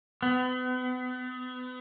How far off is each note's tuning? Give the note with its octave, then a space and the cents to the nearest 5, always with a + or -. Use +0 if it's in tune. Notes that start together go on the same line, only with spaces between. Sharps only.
B3 +40